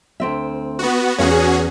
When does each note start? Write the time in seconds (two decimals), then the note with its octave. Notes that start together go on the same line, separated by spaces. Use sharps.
0.20 D2 C4 E5
0.79 B3 F#4
1.18 E2 G2 C#4 F#4 G#4